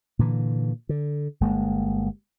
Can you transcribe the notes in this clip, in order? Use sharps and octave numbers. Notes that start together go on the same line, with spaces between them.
A#2 D3 E3
D3
G1 G#3 A#3